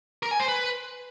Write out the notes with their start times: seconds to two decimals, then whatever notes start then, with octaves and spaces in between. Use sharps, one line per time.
0.23 A#4
0.31 G#5
0.40 C5
0.48 B4